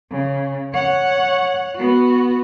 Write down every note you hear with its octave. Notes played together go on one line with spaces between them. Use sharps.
C#3
C#5 F#5
B3 F#4